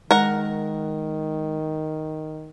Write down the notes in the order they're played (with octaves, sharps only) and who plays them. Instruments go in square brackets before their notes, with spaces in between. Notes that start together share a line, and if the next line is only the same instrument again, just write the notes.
[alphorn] D#3 [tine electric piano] G#3 [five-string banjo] A#4 F#5